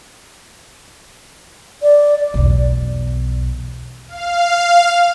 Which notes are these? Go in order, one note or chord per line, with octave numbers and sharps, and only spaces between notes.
D5
B1 E2
F5